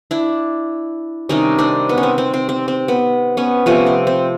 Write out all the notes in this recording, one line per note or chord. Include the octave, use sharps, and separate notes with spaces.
D4 E4
C3 D#3 G3 C#4 D#4
C4 D4
B3
C#4
C4
C4
C4
C4
C4
B3
B3 C#4
C3 F3 A3 B3 C#4
C4
C4